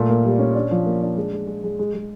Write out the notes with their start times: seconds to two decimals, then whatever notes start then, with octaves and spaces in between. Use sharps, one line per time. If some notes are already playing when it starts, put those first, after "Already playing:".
Already playing: A#2 A3
0.09 A#3
0.24 G3
0.39 C#4
0.55 D4
0.71 F3
0.86 A#3
1.02 D4
1.17 G#3
1.33 G#3
1.47 G#3
1.64 G#3
1.79 G#3
1.94 G#3